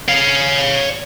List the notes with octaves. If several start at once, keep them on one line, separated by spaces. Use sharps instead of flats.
C#5 F5